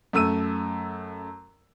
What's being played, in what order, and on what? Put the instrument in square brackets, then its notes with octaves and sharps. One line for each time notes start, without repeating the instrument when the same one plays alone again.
[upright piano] F#2 A3 E6 D#7